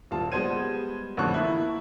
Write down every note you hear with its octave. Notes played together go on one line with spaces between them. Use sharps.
D#1 G3 F4 A5
G3 G#3 B3 C5 G#6 D#7
A1 F2 D3 C#6 F#6
A#3 E4